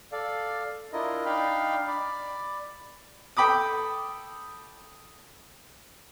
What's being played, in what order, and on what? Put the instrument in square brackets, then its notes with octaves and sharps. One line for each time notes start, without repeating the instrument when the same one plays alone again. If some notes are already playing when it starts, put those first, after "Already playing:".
[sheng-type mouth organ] A4 D5 F5
D4 E4 F4 A#4 D#5
D4 D#4 F5 G5 B5 F6
D5 B5 D6
[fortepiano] A4 G5 B5 D6 D#6